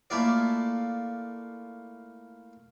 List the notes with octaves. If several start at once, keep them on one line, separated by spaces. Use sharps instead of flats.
A3 A#3 E4 F4 D5